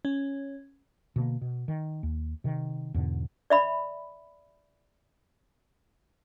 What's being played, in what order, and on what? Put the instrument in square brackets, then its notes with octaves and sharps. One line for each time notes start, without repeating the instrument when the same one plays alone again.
[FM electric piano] C#4
[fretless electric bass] B2 D3 F#3 A#3
B2
D#3
D#2
C3 D#3
E2 G#2 B2 D3
[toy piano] D5 E5 B5